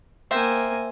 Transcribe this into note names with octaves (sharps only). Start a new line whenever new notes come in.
A#3 C5 E5 G5 G#5